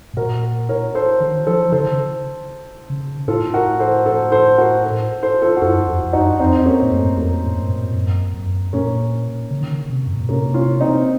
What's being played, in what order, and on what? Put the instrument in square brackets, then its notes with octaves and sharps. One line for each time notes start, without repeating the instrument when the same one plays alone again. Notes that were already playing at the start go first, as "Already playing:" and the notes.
[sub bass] A2
[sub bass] A#2 [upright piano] F#4 A#4
[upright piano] A#4 C#5
A4 C5
[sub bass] D#3
[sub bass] F3 [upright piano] A4 C5
[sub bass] C#3 [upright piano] A4 C5
[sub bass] D#3
C#3
C#3
[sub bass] A2 [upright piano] F4 A4
[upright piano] F#4 A#4
A4 C5
A4 C5
A4 C5
F#4 A#4
A4 C5
A4 C5
F4 A4
F#4
[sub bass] F#2 [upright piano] F4 A4
[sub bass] F2
F2
[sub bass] F#2 [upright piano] D#4 F#4
[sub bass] F2 [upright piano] C4 D#4
[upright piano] A#3 C#4
[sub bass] A2
[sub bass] F#2 [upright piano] A3
[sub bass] F2 [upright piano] A#3
[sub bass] A2
F#2
A#2
A2
F#2
F#2
[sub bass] A#2 [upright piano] A#3 C#4
[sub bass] C#3
D#3
C#3
C3
F#2
A2
A#2
[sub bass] C3 [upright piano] A#3 C#4
[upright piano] C#4 F4
C4 D#4